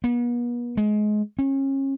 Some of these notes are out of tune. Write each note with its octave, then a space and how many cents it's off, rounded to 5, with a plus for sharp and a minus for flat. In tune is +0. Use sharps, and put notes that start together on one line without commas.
B3 -40
G#3 +25
C#4 -30